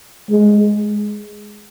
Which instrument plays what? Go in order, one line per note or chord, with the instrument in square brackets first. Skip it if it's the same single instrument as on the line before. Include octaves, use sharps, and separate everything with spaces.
[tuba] G#3